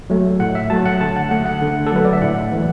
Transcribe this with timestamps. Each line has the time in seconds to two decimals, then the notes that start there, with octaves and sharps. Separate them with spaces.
0.10 F#3 A3
0.40 A2 F#5
0.55 E5
0.70 F#3 A3 A5
0.85 F#5
1.01 D3 A5
1.16 F#5
1.31 A3 F#5
1.46 F#5
1.61 D3
1.86 A4
1.92 F#3 A3 B4
2.05 D5
2.13 E5
2.22 A2 F#5
2.52 E3 A3